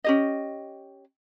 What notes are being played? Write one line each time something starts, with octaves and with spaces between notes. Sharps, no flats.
C#4 G4 D#5